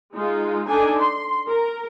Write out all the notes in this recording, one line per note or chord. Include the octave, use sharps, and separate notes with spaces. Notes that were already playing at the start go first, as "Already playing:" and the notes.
G#3 D#4 F4
D4 D#4 A4 G#5
C6
A#4